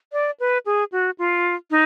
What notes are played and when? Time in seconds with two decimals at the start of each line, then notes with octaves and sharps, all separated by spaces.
0.13 D5
0.40 B4
0.66 G#4
0.92 F#4
1.19 F4
1.71 D#4